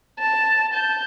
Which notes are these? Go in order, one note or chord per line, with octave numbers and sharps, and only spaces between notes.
A5
A5 G6